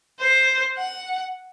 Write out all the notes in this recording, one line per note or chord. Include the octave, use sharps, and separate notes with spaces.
C5
F#5